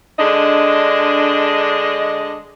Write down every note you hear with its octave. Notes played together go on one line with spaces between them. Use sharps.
D3 G#3 D4 D#5